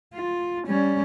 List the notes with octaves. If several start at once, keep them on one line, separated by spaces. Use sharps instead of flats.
F4
G3 C#4